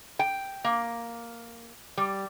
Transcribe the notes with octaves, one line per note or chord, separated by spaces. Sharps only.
G5
A#3
G3